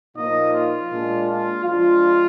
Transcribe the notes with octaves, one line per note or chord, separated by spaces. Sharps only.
A#2 F3 A#3 D#4 D#5
F4
A#2 G#3 D4
F4
F3 G#3 D4 F4